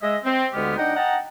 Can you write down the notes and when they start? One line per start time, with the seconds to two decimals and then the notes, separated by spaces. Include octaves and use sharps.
0.02 G#3 D#5 E5
0.24 C4
0.53 D2 D3 G#3 B3 G4 F6
0.77 D4 D#4 D#5 F#5 G5
0.96 D#5 F#5 G5 A5 A#5